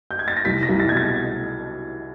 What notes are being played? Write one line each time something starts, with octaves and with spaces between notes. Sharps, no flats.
G6
G#6
A6
A#6
C2 B6
A#6
C2
A6
B2 G#6
A6